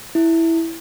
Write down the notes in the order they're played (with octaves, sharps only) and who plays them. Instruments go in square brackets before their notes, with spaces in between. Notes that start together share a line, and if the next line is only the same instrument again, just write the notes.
[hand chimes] E4